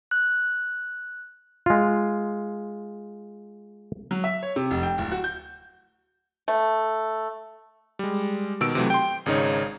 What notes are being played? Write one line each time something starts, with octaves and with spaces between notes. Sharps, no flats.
F#6
G#3 F4
F#3
E5
C#5
C3
F1
G5
D1
F#4
G6
A3
G3 G#3
B2 D#3 E6 D7
C3 E3 F#3 A3
G5 C6
G#1 C#3 D#4 C#5